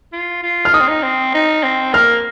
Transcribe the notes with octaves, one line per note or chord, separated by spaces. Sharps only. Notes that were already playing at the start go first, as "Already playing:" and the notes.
F4
F4
F6
D#4 D#6
C4
D#4
C4
D#4
C4
A#3 F6